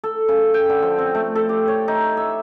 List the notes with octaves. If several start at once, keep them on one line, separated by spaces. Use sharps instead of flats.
A4
C#3
G5
D3
F3
C4
A3
A4
G4
C#5
D#4
E5